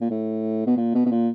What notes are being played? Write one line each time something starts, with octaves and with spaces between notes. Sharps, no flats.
A#2
A2
B2
A#2
B2
B2
A#2